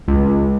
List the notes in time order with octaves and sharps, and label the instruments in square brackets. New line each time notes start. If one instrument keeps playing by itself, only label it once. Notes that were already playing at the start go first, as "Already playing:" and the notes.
[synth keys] C#2